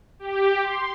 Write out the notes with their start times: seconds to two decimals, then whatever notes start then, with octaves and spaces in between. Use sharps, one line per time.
0.19 G4
0.63 C6